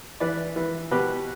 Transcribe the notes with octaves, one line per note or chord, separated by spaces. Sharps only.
E3 B4 D5
E3
B2 G4 B4